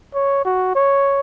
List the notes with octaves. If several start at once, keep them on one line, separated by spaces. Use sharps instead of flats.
C#5
F#4
C#5